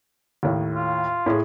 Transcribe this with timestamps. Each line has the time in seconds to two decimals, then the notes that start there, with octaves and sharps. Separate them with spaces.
0.43 D#2 A2
0.75 F4
1.26 A2 G#4